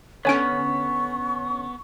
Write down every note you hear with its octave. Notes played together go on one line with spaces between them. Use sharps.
D3 B3 C#4 C#5 G#5 C#6 D7